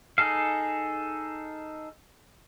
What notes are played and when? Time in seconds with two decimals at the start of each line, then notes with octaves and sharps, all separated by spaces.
0.18 D#4 G#4 A4 F5